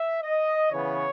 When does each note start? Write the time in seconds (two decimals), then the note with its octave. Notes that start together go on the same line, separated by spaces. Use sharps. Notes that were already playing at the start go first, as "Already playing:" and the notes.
Already playing: E5
0.22 D#5
0.72 C#3 E3 B3 C#5